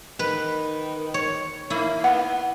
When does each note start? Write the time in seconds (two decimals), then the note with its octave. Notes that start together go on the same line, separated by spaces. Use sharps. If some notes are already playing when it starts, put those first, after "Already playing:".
0.19 D#3 B4
1.14 C#5
1.70 A#3 E4
2.04 B3 F#5